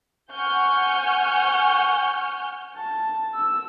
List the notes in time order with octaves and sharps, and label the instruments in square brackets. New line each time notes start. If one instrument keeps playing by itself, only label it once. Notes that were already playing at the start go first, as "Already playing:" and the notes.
[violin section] F#5 G#5 C#6 F6 G6
[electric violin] A5
E6